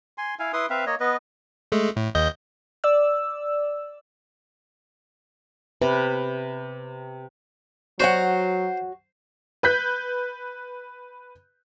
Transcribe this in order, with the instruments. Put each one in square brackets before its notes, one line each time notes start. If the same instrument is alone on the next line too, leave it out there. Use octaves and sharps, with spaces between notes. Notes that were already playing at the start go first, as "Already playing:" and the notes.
[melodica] G#5 C6
E4 F5 G#5
E4 B4 C6 D#6
C4 B4 E5 F5
A#3 C#5 D#5
B3 B4 D#5
[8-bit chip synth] G#3 A3
A2
D#2 D#5 G6
[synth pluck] D5 E6
[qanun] C3 [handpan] B4
[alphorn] F#3 [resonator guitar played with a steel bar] F#4 C#5 F#5 [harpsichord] C5
[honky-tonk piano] B4 F#6 G6 B6